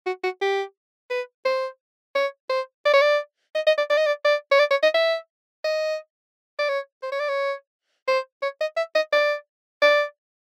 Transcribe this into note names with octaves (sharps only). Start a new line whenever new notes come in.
F#4
F#4
G4
B4
C5
C#5
C5
D5
C#5
D5
D#5
D#5
D5
D5
D#5
D5
D5
C#5
D5
C#5
D#5
E5
D#5
D5
C#5
C5
C#5
D5
C#5
C5
C#5
D#5
E5
D#5
D5
D5